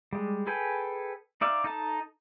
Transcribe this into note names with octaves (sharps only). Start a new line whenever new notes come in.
G3 G#3
G#4 A4 B4 G5 G#5
D#4 D5 E5 F5
D#4 A4 A5